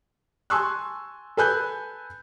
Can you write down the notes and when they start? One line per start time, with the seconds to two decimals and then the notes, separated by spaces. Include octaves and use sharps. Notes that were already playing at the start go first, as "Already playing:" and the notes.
0.50 G#5 A5 C6 C#6 E6 F#6
1.37 A4 B4 G#5 B5 F#6 G6